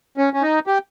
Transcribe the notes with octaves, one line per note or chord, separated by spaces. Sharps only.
C#4
C#4
D#4
G4